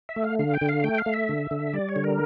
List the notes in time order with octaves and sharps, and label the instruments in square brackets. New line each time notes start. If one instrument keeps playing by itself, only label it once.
[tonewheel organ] E5
A3
F5
D3 F5
G5
D3
F5
A3 G5
F5
A3
E5
D3
D3
G3 D5
C#5
D3
A#4